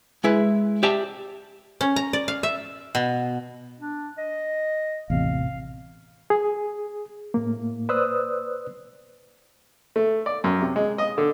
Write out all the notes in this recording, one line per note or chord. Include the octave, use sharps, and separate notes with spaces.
G#3 E4 B4
G4 D5 E5 G5 A5
C#4
A#5
D5
F5
E5
B2
D4
D#5
A1 E2 C3 F5
G#4
A2 A#3
B4 C5 D5 D#6 E6 F#6
A3
D5
F#2
C3
G#3
D#5
D3